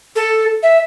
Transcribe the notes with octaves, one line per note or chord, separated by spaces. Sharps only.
A4
E5